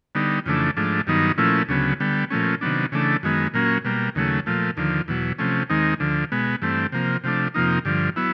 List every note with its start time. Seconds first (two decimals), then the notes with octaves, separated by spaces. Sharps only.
0.15 D3 G3 B3 D#4
0.46 F2 C#3 E3 A3 D4
0.77 G#2 F3 A3 D4
1.07 G2 D#3 F#3 B3 D#4
1.38 A#2 F3 A3 C#4 E4
1.69 D2 C#3 F#3 B3
2.00 D3 G3 B3
2.30 A#2 F3 A3 C#4
2.61 C3 D#3 F#3 B3 D4
2.92 C#3 E3 A3 D4
3.23 F#2 D#3 G#3 B3
3.54 A#2 F#3 A#3 C#4
3.85 B2 G3 A#3
4.15 D#2 C#3 F#3 A3
4.46 A#2 F3 A3
4.77 D#2 D3 F3
5.08 E2 B2 F#3
5.38 C3 F3 A3 C#4
5.70 D#2 D#3 G#3 C4 D#4
6.00 D2 D3 F3
6.32 B2 G#3 B3
6.62 G2 E3 A3 C4
6.92 C3 F3 A#3
7.24 C3 F3 A3 D4
7.54 F2 C3 F3 A#3 D#4
7.85 G2 D3 F3
8.16 F#3 B3 E4